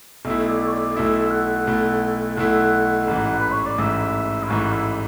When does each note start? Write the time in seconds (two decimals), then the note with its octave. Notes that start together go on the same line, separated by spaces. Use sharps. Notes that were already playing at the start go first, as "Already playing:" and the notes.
0.25 B1 B2 A3 E4 E5
0.49 D5
0.67 C#5
0.72 D5
0.96 B1 B2 A3 E4 E5
1.25 E5
1.31 F#5
1.67 B1 B2 A3 E4
2.37 B1 B2 A3 E4 F#5
3.08 A1 G#2 E3
3.39 B4
3.52 C#5
3.66 D5
3.78 A1 G#2 E3 E5
4.44 E4
4.49 A1 G#2 E3 F#4
4.73 E4